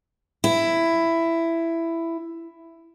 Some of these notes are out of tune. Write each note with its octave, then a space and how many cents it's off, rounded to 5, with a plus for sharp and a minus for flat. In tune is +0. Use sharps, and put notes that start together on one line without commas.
E4 +10